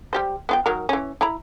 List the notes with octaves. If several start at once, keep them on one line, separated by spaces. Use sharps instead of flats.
G3 G4 C5
B3 F4 G5
D#3 F#3 A#4
E3 C#4
E4 A#5 B5